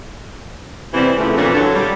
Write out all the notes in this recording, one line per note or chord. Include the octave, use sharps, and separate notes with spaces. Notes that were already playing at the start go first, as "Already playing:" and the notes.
C3 E3 G3 B3 C4 E4
C#3 E3 F3 A3
F2 A#2 E3 C#4 D4
E2 D3 F#3 F#4 A4 C#5
G3